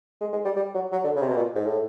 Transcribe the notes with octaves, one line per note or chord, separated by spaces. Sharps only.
G#3
G#3
G3
G3
F#3
F#3
D3
C#3
C3
B2
A#2
G#2
A2